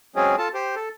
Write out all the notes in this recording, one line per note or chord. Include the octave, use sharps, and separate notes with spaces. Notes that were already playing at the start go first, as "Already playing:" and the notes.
F#3 G#3 C4 C#4 G#4
F4 A4 A5
G4 C5
A4